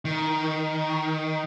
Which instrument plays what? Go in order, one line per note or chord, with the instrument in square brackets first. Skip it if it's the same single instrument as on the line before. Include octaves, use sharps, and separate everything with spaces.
[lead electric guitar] D#3